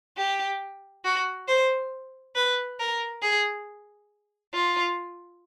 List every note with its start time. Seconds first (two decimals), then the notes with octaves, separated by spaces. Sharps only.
0.17 G4
1.04 F#4
1.48 C5
2.35 B4
2.79 A#4
3.22 G#4
4.53 F4